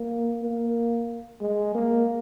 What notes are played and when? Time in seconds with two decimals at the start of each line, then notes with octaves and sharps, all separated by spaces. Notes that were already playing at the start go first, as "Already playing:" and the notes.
Already playing: A#3
0.42 A#3
1.41 G#3
1.75 A#3